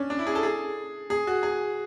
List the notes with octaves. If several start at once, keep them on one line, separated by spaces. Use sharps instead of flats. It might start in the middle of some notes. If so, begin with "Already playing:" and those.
Already playing: C#4 D4
D4
E4
G#4
A4
G#4
G#4
F#4
G#4